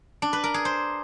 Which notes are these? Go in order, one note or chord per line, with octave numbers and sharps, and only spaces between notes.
D4
B4
A#4
G#4
C5